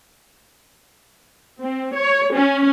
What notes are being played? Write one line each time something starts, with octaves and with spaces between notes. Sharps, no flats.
C4
C#5
C#4